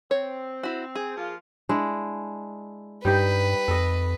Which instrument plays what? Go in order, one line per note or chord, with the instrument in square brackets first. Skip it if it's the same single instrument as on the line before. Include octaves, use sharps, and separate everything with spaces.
[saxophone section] C4 [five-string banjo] C#5
[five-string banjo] E4 F#4
G#4
[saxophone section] F3 A#3 F4
[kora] G#3 D4 E4
[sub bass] G2 [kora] G3 D#4 G4 [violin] B4
[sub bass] F2 [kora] A4 D#5